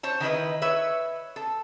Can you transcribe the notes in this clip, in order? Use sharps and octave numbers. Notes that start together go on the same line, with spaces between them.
C5 C#5 A5
D#3 E4 B4 D#5
B4 C#5 E5
A4